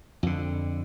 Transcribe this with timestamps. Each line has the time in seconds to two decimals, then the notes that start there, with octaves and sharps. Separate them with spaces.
0.23 F2 D3